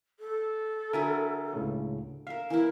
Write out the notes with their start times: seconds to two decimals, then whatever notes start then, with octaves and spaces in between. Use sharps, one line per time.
0.19 A4
0.93 D3 F#3 A#4 B4 E5 G#5
1.53 C#2 A2 C#3
2.27 A#4 E5 F5
2.50 E3 E4 A#4